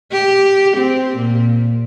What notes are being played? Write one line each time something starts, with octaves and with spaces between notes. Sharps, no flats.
G4
C4
A#2